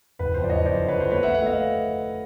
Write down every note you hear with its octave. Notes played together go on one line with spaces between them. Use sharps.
F#1 B4
F2 C5
D5
F#1 C#5 D#5
F2 C5 D5
D3 C5
B4 C#5
F2 C5
A3 B4 C#5
E5 F#5
A3
E5 F#5
A3 D#5 F5